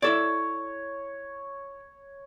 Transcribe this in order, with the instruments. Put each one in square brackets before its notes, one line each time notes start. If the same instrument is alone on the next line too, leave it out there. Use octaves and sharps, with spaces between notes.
[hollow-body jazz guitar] E4 A4 D5 [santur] C#5